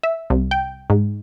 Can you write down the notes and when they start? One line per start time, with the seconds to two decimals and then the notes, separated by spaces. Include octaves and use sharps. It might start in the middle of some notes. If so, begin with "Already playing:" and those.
0.03 E5
0.30 C2
0.51 G5
0.90 G#2